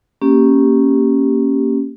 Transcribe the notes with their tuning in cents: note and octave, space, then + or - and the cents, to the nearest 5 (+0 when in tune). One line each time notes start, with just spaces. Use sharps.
A#3 +0 C#4 -10 G4 -5